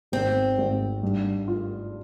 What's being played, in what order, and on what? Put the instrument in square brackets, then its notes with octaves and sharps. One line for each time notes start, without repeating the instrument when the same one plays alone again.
[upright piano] G#1 [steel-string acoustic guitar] C4
[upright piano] G#1
G2
F4